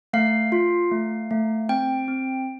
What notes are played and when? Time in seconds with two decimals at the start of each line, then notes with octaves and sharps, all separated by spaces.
0.13 A3 F5
0.52 F4
0.92 A3
1.31 A3
1.69 C4 G5
2.08 C4